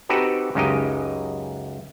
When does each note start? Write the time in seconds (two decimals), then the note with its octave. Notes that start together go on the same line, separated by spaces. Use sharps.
0.09 C4 D#4 F#4 G4 A4 B4
0.55 C#2 F#2 G#3 D#4 G4 D#5